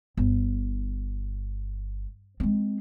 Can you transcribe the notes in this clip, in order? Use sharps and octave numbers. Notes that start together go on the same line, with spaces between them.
G1
G#3 C4